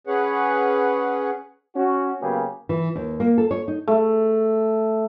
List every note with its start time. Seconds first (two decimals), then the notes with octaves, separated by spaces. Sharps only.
0.07 C#4 G#4 B4 C#5 F#5
1.76 C#4 F#4
2.22 C#3 F#3 A#3 B3 G4 G#4
2.69 E3
2.95 D#2
3.20 A#3
3.38 A4
3.51 C#5
3.68 D#4
3.88 A3